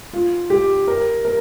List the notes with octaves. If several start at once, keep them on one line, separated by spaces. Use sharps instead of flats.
F4
G4
A#4
A#4